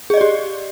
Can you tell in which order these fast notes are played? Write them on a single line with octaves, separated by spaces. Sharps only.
G#4 D#5 D5 G4